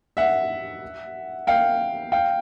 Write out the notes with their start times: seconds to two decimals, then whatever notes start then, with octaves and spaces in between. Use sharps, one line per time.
0.17 E5 F#5
1.47 F5 G5
2.12 F5 G5